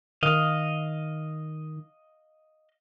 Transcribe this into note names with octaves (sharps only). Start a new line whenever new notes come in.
D#3 D#5 F5